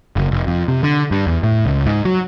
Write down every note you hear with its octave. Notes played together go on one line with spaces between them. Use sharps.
F#1
F1
F2
C3
D3
G2
E2
A2
C#2
G#2
F#3